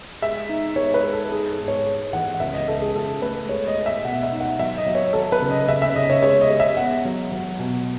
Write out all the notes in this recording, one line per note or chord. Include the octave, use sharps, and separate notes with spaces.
G#3 E5
D#4
G#3 C#5
B4
G#3
A4
D#4 G#4
A4
G#2
C#5
G#3
E3 F#5
F#5
C#2 E5
D#5
C#2 A4
G#4
C#2 A4
A3 B4
G#3 C#5
D#5
G#3
E5
B2 F#5
E5
D#4
F#5
F#3 E5
D#5
F#3
C#5
F#3 A4
B4
C#3
D#5
C#3 E5
E5
C#3 D#5
C#5
G#3 C#5
D#5
G#3
E5
B3 F#5
F#3
F#3
B2